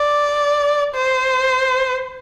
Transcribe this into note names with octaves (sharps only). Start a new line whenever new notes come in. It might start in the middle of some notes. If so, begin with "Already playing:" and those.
Already playing: D5
C5